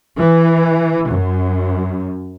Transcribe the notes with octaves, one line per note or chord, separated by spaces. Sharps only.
E3
F#2